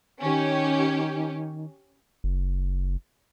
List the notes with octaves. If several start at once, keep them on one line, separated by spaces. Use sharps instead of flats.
D#3 C#4 G4
F#1